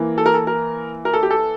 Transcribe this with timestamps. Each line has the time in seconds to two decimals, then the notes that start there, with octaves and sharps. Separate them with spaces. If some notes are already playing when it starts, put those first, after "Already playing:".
Already playing: E3 A#3
0.18 A4
0.26 A#4
0.34 A4
0.47 A#4
1.05 A#4
1.14 A4
1.23 G4
1.31 A4